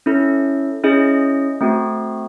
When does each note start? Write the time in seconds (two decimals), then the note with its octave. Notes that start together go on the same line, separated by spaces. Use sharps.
0.06 C#4 E4 A4
0.83 C#4 E4 G#4 D#5
1.61 A3 C4 F#4